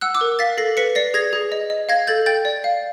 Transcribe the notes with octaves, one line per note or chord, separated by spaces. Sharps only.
F#5 E6 F#6
D6 E6
A#4
F5 A6 B6
A4 A#6 C7
B4 B6 C#7
D5 A#6 C7
G#4 G#6 A#6
G#4
D#5
D#5
F5 G#6 A#6
A4 G6 A6
G5 G6 A6
D5
F5